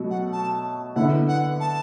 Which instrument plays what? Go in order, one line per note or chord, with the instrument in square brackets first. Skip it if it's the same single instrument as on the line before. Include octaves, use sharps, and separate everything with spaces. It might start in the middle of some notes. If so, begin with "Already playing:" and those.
Already playing: [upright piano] B2 F#3 A3 F#4
[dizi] F#5
A5
[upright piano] D3 B3 E4 [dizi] F#5
[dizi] F#5
A5